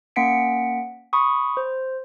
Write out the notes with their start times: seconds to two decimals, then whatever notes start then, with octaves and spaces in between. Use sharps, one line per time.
0.16 A#3 C#4 F#5 B6 C#7 D7
1.13 B5 C#6 D#6
1.57 C5